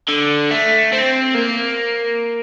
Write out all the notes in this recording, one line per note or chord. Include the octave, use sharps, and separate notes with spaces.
D3
A3
C4
A#3